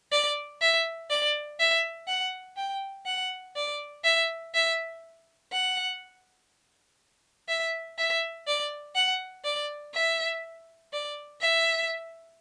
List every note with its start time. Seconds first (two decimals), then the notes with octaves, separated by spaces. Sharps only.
0.12 D5
0.61 E5
1.10 D5
1.60 E5
2.08 F#5
2.57 G5
3.07 F#5
3.56 D5
4.04 E5
4.54 E5
5.52 F#5
7.49 E5
7.98 E5
8.47 D5
8.96 F#5
9.45 D5
9.95 E5
10.93 D5
11.41 E5